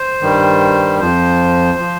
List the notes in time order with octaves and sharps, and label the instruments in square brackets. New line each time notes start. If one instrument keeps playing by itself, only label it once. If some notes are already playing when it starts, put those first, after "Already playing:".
Already playing: [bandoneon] C5
G2 D#3 G3
F2 F3 C5
F3